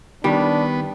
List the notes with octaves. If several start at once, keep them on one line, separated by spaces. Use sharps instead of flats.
D#3 G3 B3 D4